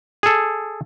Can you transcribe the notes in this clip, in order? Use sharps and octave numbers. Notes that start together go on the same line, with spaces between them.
G#4 A4